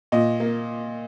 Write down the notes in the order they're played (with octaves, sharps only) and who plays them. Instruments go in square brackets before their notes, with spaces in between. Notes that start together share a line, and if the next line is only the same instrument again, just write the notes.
[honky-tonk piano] A#2 D#5
A#3